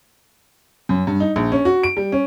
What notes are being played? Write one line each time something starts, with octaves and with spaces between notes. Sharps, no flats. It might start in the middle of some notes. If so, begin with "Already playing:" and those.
F#2
G2
D#4
A#1
C#4
F#4
D7
G3
C#4